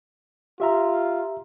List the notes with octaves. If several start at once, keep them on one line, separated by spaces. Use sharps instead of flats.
F4 G4 E5 A#5